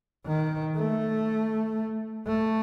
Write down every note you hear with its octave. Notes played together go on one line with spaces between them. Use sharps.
D#3
A3
A3